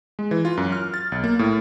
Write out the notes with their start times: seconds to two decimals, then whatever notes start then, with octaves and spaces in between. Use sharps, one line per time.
0.19 G#3
0.31 E3
0.45 F4
0.57 F#2
0.72 F6
0.94 A6
1.12 B1
1.24 A#3
1.39 A2